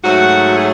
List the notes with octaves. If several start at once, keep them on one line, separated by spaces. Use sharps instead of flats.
G#2 F#3 A3 F#4
G#4